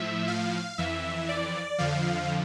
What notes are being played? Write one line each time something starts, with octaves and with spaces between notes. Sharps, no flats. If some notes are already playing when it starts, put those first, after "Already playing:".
Already playing: A2 F3 E5
F5
F2 E3 E5
D5
F2 D3 F3 F5